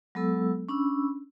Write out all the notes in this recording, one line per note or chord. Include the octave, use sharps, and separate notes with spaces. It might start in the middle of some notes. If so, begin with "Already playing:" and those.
F#3 G#3 B3 A4 E6
C#4 D4 B5 E6